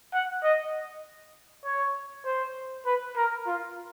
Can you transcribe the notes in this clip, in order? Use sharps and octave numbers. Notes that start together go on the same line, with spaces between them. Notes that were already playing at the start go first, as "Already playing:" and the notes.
F#5
D#5
C#5
C5
B4
A#4
F4